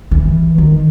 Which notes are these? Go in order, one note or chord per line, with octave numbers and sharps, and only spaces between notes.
E3
D#3